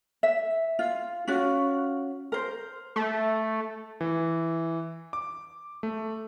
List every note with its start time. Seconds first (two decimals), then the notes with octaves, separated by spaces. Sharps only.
0.23 E5
0.79 F4
1.28 C#4 F4 F#4
2.32 A#4 C5
2.96 A3
4.01 E3
5.13 D6
5.83 A3